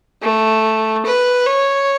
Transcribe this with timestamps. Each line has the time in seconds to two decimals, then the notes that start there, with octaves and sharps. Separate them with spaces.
0.22 A3
1.06 B4
1.46 C#5